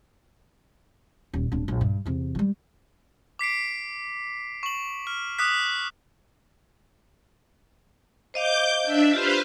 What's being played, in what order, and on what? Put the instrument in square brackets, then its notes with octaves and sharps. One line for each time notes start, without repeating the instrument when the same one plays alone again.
[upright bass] D#1
D1 D4
A#1
G2
E2 C3
F3 G3
[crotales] D6 B6 C7 D7
C#6 F#7
F6
D6 D#6 F#6 B6
[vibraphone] C5 D#5 F5 [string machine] D6 G6
[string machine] D4 E5
[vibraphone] F4 G4 [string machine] B4 C5 F5